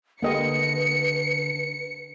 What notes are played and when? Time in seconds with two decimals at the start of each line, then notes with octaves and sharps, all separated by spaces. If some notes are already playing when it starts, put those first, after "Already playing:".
0.23 D3 A#3 G4 B4 D#5 C#7